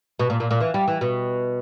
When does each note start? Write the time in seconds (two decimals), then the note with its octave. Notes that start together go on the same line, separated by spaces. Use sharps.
0.19 B2
0.30 A#2
0.40 A#2
0.51 A#2
0.60 E3
0.74 G3
0.88 E3
1.01 B2